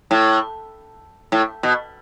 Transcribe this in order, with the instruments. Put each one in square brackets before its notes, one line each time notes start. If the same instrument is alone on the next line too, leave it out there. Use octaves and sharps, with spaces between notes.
[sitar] A2
A2
B2